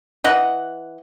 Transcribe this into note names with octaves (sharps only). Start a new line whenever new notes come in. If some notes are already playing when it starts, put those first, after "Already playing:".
E3 D#5 F#5